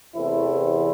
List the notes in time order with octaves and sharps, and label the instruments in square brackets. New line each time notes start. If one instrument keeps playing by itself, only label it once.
[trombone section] E2 C3 E3 A3 C4 E4